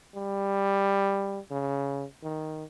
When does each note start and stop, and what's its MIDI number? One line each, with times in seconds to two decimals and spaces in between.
0.15 1.39 55
1.51 2.05 49
2.23 2.64 51